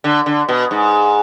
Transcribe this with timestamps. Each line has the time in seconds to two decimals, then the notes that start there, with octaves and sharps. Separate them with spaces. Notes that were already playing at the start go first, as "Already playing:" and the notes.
0.04 D3
0.26 D3
0.49 B2
0.71 G#2